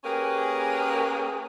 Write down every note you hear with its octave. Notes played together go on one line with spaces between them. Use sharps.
A#3 C#4 G4 G#4 A#4 B4